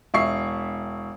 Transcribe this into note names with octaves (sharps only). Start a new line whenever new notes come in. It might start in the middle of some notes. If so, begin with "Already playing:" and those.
E1 E5 C#6 C7